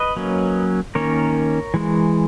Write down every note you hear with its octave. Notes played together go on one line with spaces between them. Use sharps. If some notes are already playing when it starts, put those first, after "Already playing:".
Already playing: B4 D#5
F#3 A#3 C#4
D#3 A#3 C#4 A#4 C#5
E3 G#3